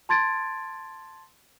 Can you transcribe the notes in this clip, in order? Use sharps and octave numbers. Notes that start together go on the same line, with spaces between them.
A5 C6 G#6 A6 D7